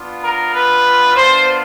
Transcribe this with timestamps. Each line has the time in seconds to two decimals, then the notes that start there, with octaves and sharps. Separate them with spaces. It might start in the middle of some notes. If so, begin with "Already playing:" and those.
Already playing: B3 D4 F4
0.22 A#4
0.53 B4
1.15 B3 D4 F4 C5